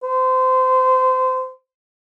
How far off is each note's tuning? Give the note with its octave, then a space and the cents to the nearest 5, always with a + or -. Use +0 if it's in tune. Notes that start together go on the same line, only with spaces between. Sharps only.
C5 -25